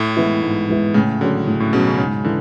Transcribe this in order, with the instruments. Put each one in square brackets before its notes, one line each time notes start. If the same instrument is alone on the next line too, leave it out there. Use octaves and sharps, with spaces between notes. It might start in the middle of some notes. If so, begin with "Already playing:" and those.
Already playing: [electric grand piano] A2
[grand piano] E3 G#3 B3 E4
G#2
E3 G#3 B3 E4
[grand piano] A2 [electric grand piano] C#3
[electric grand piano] D3 [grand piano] F#3 C#4 G#4
[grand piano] A2 [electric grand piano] C#3
[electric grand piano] A2
[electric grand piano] B2 [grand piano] F#3 C#4 G#4
[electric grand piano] C#3
[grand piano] G#2 [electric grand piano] C#3
[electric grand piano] D3 [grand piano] E3